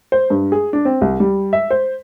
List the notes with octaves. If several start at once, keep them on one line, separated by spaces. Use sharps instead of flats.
C5
G2
G#4
D4
C4
C2
G3
E5
C5